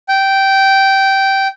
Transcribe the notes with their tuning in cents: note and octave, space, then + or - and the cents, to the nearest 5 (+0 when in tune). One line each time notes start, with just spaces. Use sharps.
G5 -15